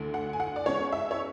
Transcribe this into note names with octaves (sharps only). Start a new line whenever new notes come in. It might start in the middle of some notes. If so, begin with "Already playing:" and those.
Already playing: D2 D3 A3 E4
F#5
G#5
F#5
D5
E2 C#3 G#3 C#4 C#5
E5
C#5